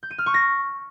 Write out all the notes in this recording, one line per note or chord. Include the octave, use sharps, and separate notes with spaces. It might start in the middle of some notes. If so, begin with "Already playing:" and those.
G6
D#7
F6
C#6
A#6